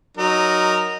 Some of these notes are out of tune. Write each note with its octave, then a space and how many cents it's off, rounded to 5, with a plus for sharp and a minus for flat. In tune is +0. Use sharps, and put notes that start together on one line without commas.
F#3 +0 D#4 -10 A#4 +0